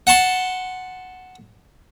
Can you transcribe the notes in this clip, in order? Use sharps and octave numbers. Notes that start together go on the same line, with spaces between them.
F#5 A5 C6